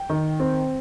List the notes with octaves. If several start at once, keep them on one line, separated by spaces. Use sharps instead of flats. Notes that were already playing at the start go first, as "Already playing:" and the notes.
Already playing: G5
D#3
C4